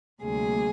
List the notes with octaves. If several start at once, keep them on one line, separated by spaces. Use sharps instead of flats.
D2 C3 G3 A#3 G#4